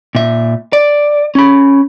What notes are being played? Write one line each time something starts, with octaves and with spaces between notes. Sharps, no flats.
A#2 E5
D5
C#4 B5